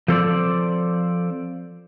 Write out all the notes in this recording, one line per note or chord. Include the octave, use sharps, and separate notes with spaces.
F3 C4 A4 A#4 C5 D5